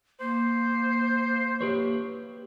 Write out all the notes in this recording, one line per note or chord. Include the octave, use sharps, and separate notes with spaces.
A#3 C5
G4 B4 C#5